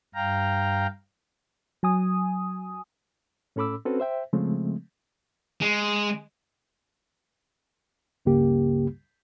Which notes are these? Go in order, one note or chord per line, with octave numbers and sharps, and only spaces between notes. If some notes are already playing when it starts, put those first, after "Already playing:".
G2 F5 G5 A#5
F#3 G#5 D#6
A2 C#4 A4 B5 D6 E6
C4 C#4 F#4 A4 B4
C5 E5 G5
C#3 F3 G#3 A3 C4
G#3
C#2 G2 C#3 A#3 G4